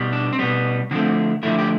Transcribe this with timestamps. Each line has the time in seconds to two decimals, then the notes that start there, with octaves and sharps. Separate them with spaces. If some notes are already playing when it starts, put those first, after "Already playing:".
Already playing: B2 G3
0.13 D4
0.33 C4
0.39 B2 G3 B3
0.91 D3 F3 A3 C4
1.43 D3 F3 A3 E4
1.59 G4